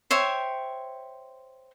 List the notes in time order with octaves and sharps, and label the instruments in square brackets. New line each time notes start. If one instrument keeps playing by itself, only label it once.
[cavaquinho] C5 C#5 E5 G5